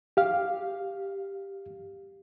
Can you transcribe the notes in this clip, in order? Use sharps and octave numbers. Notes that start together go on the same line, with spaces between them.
G4 F5